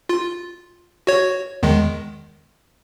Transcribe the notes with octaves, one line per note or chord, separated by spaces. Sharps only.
F4
F#4 C#5
E2 D#3 G#3